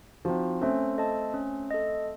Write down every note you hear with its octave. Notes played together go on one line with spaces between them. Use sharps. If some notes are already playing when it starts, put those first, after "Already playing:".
F3 C4 D#4 F#4
A3 C4 C#4
A4 D#5 A5
C#4
A4 D#5